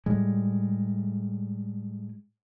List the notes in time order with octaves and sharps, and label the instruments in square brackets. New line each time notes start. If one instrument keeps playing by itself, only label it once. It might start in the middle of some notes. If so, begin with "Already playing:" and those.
[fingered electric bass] A2 G3 G#3